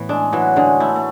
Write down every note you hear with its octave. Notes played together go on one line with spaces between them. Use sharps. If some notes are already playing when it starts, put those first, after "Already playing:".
Already playing: A2 E3 B3
G#3 D4
E3 F#3
D3 G#3
A3 E4
A3